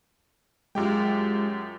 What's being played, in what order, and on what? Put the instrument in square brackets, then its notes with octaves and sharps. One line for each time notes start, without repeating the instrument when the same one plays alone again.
[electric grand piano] F#2 G4 G5 [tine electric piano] G#3 F4